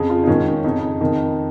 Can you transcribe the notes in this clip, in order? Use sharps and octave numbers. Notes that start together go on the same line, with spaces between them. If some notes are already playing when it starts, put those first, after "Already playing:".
Already playing: F2 C#3 G#4
F4
D#4
G#2 D#3 C#4
C#4
F2 C#3 D#4
F2 D#3